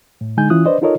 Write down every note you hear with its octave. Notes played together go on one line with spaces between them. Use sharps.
A2
D3 G#3 D#4 G#5 G6
E3 C#4 E4 F4 D#6 F#6
D4 B4 C5 D5 D#5
D#4 F4 A4 A#4 C#5 D#5